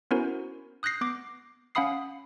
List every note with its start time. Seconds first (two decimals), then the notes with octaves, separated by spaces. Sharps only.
0.11 B3 C#4 E4 F#4 A#4 C5
0.83 D#6 F#6 G6 A#6 C7
1.01 B3 D6
1.75 C#4 F5 F#5 B5 D#6 C7